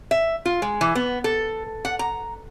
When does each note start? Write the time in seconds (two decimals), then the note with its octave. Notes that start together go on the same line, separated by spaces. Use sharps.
0.11 E5
0.46 F4
0.62 G#3
0.81 E3
0.95 B3
1.24 A4
1.85 F#5
1.99 A#5